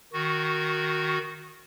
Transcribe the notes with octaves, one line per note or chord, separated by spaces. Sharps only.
D#3 F#4